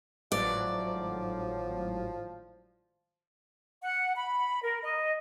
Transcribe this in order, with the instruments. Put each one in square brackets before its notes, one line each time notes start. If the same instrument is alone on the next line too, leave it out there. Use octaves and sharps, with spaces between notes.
[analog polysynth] G#1 A2 F#3 [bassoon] F3 [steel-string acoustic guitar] D5
[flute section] F#5
B5
A#4
D#5